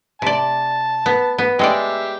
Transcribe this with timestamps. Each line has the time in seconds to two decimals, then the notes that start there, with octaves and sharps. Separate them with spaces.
0.22 C3 D5 A5
1.06 B3
1.38 B3
1.59 G#3 G4 A4 D5 E5